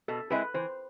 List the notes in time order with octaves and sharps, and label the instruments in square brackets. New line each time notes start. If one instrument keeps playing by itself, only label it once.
[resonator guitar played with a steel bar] B2 [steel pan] A4
[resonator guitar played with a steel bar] G#3 C4 E4 G#4 [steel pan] B4
[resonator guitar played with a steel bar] E3 [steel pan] C5